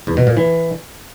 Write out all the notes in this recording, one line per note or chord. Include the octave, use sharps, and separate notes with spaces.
E2
B2
A#2
E3